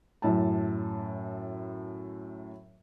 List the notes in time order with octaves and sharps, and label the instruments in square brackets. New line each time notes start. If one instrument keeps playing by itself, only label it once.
[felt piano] F#2 A2 A5